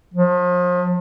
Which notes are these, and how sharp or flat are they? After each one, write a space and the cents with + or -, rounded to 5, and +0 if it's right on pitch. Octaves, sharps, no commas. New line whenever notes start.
F3 +35